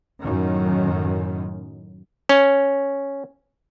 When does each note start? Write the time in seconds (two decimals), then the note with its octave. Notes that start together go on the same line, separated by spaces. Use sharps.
0.21 F#2 A2 D#3
2.29 C#4